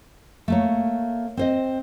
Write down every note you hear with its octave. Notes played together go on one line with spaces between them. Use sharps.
A3 A#3 C#5
C4 C5 D#5